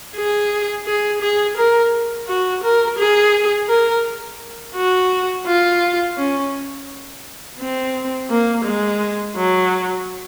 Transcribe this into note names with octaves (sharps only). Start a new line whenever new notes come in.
G#4
G#4
G#4
A#4
F#4
A#4
G#4
A#4
F#4
F4
C#4
C4
A#3
G#3
F#3